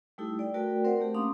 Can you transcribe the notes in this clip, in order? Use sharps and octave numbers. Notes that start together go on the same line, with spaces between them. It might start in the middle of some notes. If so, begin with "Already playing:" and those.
G3 A3 D#4 E4 G4 A4
D5 G5
A3 F#4 A#4 B4 D5 G5
C4 A#4 C5 D5 F#5
A3 G4
A#3 C#4 D4 F5 C6 D#6